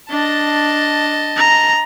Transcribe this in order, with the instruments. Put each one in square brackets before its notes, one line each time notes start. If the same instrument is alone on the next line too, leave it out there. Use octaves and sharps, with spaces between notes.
[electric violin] D4 [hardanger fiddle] D#5 A5
[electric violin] A#5